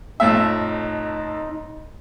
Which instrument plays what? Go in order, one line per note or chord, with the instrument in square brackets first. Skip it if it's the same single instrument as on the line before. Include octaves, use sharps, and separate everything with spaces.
[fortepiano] F2 A2 E5 [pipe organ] D#4